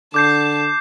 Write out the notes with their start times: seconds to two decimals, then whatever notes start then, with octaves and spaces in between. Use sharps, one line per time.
0.14 D3 A5 D6 G6 C7